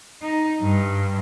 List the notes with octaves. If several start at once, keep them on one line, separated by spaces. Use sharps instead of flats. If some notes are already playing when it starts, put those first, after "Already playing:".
D#4
G2